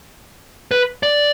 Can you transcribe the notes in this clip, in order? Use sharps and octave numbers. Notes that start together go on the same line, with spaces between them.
B4
D5